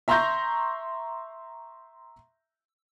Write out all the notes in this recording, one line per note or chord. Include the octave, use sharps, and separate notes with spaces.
E5 A#5 C6 C#6 G6 A#6